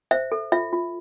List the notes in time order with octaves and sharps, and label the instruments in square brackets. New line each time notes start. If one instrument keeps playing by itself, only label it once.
[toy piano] C5 E5
A4
F4 E5
F4